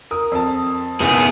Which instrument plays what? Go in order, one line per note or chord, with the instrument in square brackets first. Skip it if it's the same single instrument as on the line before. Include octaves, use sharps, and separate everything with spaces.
[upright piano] A#4 D#6
F2 A5
[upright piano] F#1 B1 D#7 [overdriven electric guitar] B3 G#4